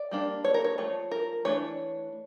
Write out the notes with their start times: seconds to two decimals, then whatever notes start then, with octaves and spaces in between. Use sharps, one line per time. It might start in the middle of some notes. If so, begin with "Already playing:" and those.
Already playing: D5
0.11 G3 A#3 D4
0.45 C#5
0.54 A#4
0.64 C#5
0.78 F3 A3 C#5
1.11 A#4
1.45 E3 A3 D4 C#5